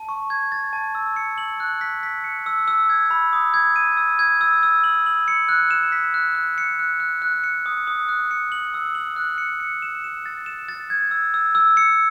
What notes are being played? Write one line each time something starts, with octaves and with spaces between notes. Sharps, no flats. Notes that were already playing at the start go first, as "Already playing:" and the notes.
Already playing: A5
C#6
G#6
A6
A5
E6
C#7
F#7
F#6
B6
B6
C#7
E6
E6
G#6
B5
D#6
G#6
D#7
E6
G#6
E6
E6
F#7
F#7
C#7
F#6
E7
B6
F#6
F#6
C#7
F#6
F#6
F#6
C#7
D#6
D#6
F#6
C#7
F#7
E6
F#7
F#6
C#7
C#7
E7
E7
A6
E7
A6
G#6
E6
E6
E6
C#7